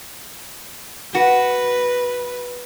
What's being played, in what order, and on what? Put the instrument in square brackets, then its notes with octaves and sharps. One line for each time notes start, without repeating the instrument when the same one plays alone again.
[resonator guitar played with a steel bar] F#4 [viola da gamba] B4